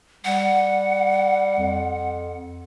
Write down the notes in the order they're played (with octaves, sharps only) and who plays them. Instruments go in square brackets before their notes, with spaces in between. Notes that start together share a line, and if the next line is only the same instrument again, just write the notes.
[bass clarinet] G3 [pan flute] F#5
[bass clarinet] F2